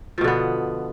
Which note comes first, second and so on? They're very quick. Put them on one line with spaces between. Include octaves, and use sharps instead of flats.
F3 B2 D3 B3